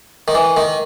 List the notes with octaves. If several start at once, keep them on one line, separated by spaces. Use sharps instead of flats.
D#3
E3
D#3